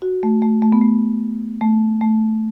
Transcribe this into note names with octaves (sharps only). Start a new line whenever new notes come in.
F#4
A3
A3
A3
B3
A3
A3
A3